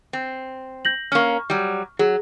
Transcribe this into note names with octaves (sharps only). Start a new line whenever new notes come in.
C4
G6 A#6 F#7
A#3 C#4 C#6 F6
F#3 G3
F#3 G#4